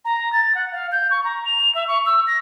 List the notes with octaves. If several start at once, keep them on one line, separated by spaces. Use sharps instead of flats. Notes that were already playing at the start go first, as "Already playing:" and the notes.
A#5
A6
F#5
F5
G6
C#6
A#5
F7
E5
C#6
E6
A#6